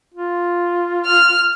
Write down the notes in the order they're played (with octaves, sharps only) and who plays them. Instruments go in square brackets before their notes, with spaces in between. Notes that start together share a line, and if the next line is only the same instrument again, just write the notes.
[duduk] F4
[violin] F6